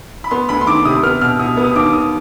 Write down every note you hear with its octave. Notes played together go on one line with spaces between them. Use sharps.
B5
B3 C6
D2 B5
C6
D#3 D6
C3 D#6
B3 F6
B2 F6
B2 D#6
B3
D#6
D#2 D6
D#2 D#6